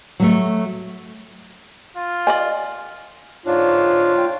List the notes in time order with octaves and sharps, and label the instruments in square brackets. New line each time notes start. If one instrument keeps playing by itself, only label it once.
[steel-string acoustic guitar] F#3 A3
[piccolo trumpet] F4
[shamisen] D5 D#5 G#5
[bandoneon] G#2 D4 [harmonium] F4 [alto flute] C#5
[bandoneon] G5